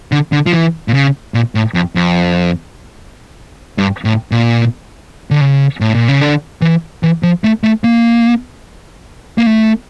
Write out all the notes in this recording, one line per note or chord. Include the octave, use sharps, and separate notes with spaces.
D3
D3
F3
E3
A#2
C#3
A#2
A2
F2
F2
G2
A2
A#2
D3
C#3
A2
A#2
C#3
D3
E3
E3
F3
A3
A3
A#3
A#3
A3